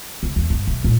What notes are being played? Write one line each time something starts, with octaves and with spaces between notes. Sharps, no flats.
C#3
E2
G2
B1
A#2